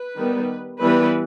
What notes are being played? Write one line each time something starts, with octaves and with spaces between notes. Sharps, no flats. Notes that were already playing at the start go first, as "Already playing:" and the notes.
Already playing: B4
D#3 G3 B3
E3 G3 B3 B4